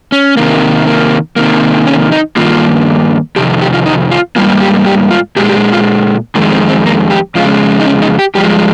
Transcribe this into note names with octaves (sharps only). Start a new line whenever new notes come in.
C#4
C3 D#3 A#3
A#3
C3 D#3 A#3
C#4
D#4
G2 D#3 A#3 F4
F2 C3 D#3 G4
G4
F4
D#4
F4
G#2 G3 A#3 F4
G4
G4
F4
A#2 G#3 G4
G4
F4
F2 D#3 G#3 A#3
C4
C4
A#3
G4
F2 C#3 G#3 F4
D#4
C#4
D#4
G4
G2 F3 G#3 G4